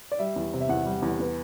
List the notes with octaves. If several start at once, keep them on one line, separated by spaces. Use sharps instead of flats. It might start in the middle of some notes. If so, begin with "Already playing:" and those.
D5
G3 E5
E2
C3
E5
E2 F#5
G3
E2
B3